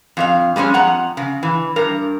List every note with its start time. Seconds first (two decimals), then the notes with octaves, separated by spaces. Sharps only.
0.17 F2 F#4 F5
0.56 G3 G#3 A#3 C#4
0.74 F2 F#5 A#5
1.17 C#3
1.43 E3
1.76 G2 A#4